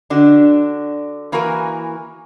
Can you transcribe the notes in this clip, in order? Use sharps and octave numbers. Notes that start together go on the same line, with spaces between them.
D3 D4 F#4
E3 A#3 E4 F#4 A#4 G#5